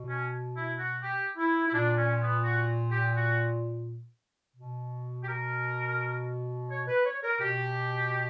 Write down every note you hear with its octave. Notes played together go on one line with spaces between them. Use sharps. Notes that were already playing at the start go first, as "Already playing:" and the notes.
Already playing: B2
C#4
E4
F#4
G4
E4
E4
A#2 D4
C#4
B3
F#4
G4
F#4
B2
G4
A#4
C#5
B4
C#5
A#4
B2 G4